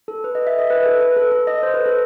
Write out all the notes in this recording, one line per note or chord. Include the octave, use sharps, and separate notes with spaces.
A4
B4
D#5
E5
D#5
B4
A4
B4
A4
A4
D#5
C5
B4
A4